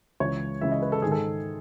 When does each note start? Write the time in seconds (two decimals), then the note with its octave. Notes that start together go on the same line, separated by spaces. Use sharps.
0.20 C#2 C#3 E3 C#5
0.61 C#2 C#3 E3 E5
0.72 D#5
0.82 B4
0.92 A4
1.02 G#2 D#3 G#4
1.12 A4